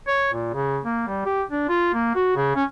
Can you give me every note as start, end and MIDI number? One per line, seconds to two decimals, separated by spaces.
0.07 0.29 73
0.33 0.49 46
0.54 0.79 49
0.84 1.05 58
1.07 1.24 55
1.26 1.42 67
1.51 1.64 62
1.69 1.90 65
1.94 2.13 58
2.15 2.35 66
2.36 2.55 49
2.56 2.64 61